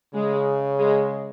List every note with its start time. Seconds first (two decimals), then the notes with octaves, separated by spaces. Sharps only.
0.14 C#3 G#3
0.79 G#3